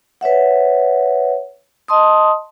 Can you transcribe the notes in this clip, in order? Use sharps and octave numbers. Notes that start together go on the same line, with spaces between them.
B4 C#5 E5 F#5
D#5 A5 C6 D#6